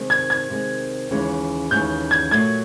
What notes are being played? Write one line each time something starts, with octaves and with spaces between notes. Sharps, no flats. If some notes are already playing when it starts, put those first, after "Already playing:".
Already playing: C3 D#3 G#3
G#6
G#6
C3 D#3 G#3
D#2 C#3 E3 G#3 C#4
D#2 C#3 E3 G#3 C#4 G6
G#6
A#2 F#3 A3 G#6